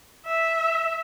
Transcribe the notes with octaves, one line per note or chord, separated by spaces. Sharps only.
E5